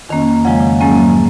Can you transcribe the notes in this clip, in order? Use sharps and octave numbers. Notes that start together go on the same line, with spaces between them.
F2 D#3 A#3 C#4
F2 C#3 F3 G#3 F#5
G#2 F#3 A#3 C#4 G#5